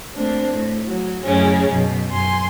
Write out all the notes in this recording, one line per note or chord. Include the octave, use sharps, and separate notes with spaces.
A3 A#3 C4 D4
A2
F#3
F#2 A2 C#3 G#3 C#4
F#2 B2
F#2 G#5 C6